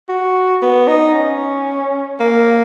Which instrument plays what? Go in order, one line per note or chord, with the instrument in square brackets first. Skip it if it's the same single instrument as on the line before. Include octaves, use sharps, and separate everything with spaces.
[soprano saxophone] F#4
B3
D#4
C#4
A#3